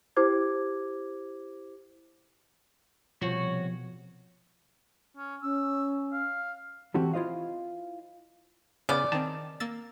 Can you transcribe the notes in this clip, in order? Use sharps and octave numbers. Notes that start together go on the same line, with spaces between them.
E4 G4 C5 D6 G#6
C2 B2 F3 F#4 C#5
C#4
C#4 E6
F5
E3 C4 E4 F#4 G4 A4
E4 F4 C5 D#5 F5
C#3 B3 D5
D#3 C4 A5
A#3 E6 A6